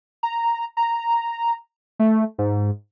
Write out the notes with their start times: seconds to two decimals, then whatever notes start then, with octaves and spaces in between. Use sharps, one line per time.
0.23 A#5
0.77 A#5
1.99 A3
2.38 G#2